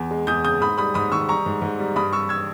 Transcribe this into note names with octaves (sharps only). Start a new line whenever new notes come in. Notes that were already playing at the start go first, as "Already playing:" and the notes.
Already playing: E2
G#3
E2 D#6 G6
C#3 D#6 G6
G#2 B5 D#6
G3 B5 D#6
G#2 B5 D#6
D#3 C#6 E6
G3 A#5 C#6
G#2
G#2
G3
G2 B5 D#6
G3 C#6 E6
E6 G#6